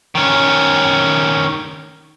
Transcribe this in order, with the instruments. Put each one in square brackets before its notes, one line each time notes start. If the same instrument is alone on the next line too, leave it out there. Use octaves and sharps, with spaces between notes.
[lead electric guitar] D#3 C#4